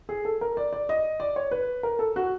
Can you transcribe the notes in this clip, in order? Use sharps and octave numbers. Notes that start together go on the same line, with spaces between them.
G#4
A4
A#4
D5
D5
D#5
D5
C#5
B4
A#4
A4
F#4